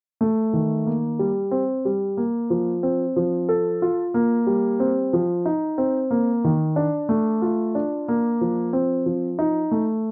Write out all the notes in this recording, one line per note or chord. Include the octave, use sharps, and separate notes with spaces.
A3
D#3
A#3
G3
C4
G3
A#3
F3
C4
F3
A4
F4
A#3
G3
C4
F3
D#4
C4
A#3
D#3
D4
A3
F4
D4
A#3
F3
C4
F3
D#4
A3